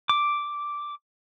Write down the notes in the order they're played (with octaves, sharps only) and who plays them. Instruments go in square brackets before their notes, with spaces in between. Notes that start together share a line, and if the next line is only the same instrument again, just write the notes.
[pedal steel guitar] D6